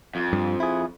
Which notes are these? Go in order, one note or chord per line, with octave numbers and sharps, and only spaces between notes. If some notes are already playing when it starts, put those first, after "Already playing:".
F2
G2
E4 G#4